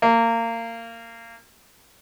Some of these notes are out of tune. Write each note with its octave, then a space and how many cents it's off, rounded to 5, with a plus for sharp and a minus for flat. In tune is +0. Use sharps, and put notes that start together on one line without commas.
A#3 -25